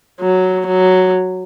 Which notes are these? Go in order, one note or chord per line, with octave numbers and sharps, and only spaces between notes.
F#3
F#3